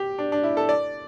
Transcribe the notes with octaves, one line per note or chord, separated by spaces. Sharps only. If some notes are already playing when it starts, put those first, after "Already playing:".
Already playing: G4
D4
D4
E4
A4
D5